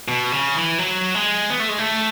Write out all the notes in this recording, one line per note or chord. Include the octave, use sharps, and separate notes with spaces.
B2
C#3
E3
F#3
G#3
B3
A3
G#3
A3